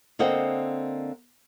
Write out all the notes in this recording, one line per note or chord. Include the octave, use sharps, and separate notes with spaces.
D3 A#3 C4 D#5 F#5 G5